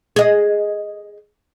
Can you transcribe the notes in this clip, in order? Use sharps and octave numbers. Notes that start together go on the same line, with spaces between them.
G#4 D#5